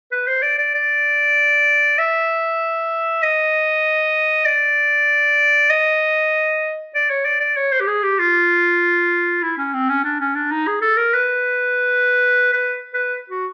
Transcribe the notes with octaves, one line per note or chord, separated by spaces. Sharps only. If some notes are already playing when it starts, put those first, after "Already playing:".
B4
C5
D5
D5
D5
E5
D#5
D5
D#5
D5
C#5
D5
D5
C#5
C5
G4
G#4
G4
F4
E4
C#4
C4
C#4
D4
C#4
D4
D#4
G#4
A4
A#4
B4
B4
B4
F#4